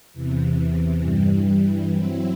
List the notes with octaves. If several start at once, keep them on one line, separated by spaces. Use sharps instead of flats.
E2 C3 E3
G2 E3 G3
F#3 C4 E4